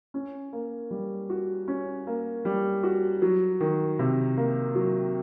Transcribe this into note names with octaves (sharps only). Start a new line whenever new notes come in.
C#4
A#3
G3
F#4
C#4
A#3
G3
F#4
F#3
D#3
C3
A#3
F#3